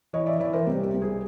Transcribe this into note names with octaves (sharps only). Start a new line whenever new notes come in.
E3 C#5 D#5
D5 E5
E3 D5 E5
A#4 C5
C2 G4
G4
C2
G#4